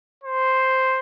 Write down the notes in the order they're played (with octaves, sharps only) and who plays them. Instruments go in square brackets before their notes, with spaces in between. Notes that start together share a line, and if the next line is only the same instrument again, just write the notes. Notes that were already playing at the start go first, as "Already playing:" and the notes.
[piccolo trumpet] C5